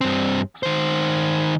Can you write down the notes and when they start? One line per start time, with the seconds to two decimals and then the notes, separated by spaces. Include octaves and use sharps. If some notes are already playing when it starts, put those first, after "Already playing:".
0.01 G2 C4
0.63 D#3 C5